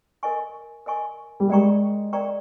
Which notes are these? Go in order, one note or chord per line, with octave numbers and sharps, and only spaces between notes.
A#4 D#5 G#5 C#6
A#4 D#5 G#5 C#6
G3
G#3 A#4 D5 G5 A#5 C#6
A#4 D5 G5 A#5 C#6